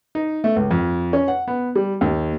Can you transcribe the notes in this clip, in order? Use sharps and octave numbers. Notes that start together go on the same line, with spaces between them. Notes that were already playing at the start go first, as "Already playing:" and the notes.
D#4
A3
C#2
F2
C#4
F#5
B3
G3
D#2